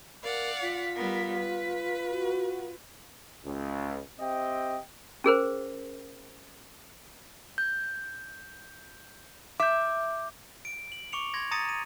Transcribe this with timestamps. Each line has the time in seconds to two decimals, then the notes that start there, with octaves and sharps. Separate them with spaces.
0.24 A#4 D5 F5 F#5
0.62 F4 B6
0.95 G3 B3 A#4
1.37 B4
2.11 F#4
3.45 C#2
4.20 C4 G4 D#5 E5 G5
5.24 C#4 G#4 A#4 C5
7.58 G6
9.60 E5 D6 G6
10.65 D7
10.92 F#7
11.13 C#6 D6 C#7 F7
11.34 C6 G#6 A#6
11.51 A#5 D#6 A6 A#6 C#7 D#7
11.65 A#5 D#7